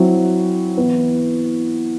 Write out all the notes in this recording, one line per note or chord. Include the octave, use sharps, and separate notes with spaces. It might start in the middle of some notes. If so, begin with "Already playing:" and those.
Already playing: F#3 C4 E4
E3 B3 E4